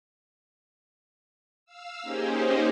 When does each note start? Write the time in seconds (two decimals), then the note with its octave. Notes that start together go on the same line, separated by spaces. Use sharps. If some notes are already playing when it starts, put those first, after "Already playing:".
1.66 F5 E6
2.02 A#3 C#4 D#4 G4 G#4 C5